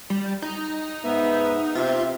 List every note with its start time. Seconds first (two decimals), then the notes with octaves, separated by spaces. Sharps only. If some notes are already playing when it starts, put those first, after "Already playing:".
0.10 G3
0.42 D#4
1.04 G#2 B3 E5
1.75 C3 C4 F4 E5